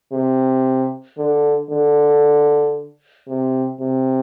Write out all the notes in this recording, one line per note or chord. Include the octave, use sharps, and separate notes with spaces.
C3
D3
D3
C3
C3